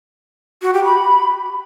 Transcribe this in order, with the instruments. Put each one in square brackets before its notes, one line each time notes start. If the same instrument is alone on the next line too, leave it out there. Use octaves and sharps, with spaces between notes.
[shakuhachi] F#4
G4
B5